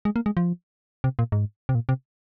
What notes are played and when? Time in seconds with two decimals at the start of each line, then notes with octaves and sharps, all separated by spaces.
0.05 G#3
0.16 A#3
0.26 G#3
0.37 F3
1.04 C3
1.19 A#2
1.32 G#2
1.69 C3
1.75 A#2
1.89 C3